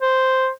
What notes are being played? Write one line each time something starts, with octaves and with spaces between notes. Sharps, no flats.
C5